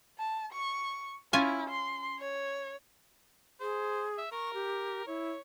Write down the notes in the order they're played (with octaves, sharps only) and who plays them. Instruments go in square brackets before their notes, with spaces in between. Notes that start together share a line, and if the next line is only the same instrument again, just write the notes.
[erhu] A5
C#6
[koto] C#4 F4 G#5 [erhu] E4
[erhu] C6
C#5
[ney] G#4 [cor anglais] C5
[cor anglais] E5
[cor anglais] A#4 [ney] C#6
[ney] G4
[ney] E4 [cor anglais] C#5